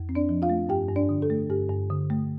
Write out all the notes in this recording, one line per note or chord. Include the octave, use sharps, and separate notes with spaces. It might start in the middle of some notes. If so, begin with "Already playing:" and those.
Already playing: F2
C4
D4 D5
F3
F4 F5
A3
G2 G4 G5
G2
D4 D5
D3
A4
A3
G2 G4
G2
D3
A3